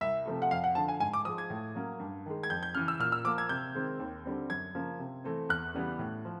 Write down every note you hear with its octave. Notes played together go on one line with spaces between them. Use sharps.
C2 E5
C3 F3 A3
F#5
F2 F5
F#5
D3 F3 A5
G#5
G#2 G#5
D6
F3 G#3 D#6
G#6
A2
F#3 A#3 C#4
G2
D#3 G#3
G#6
F2 G6
G6
C#3 E3 F6
E6
A#2 F6
E6
F3 A#3 D6
G#6
C3 G6
D#3 G#3 C4
D#2
D3 G3 C4
F#2 G#6
C#3 F3 A#3
C3
E3 A3 C4
E2 F#6
C#3 E3 G3 B3
A2
F3